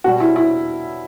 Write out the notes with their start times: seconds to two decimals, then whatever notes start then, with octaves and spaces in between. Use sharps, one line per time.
0.04 B2 G3 F#4
0.20 E4
0.36 E4